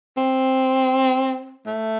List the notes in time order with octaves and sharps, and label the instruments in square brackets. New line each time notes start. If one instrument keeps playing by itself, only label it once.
[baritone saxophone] C4
A3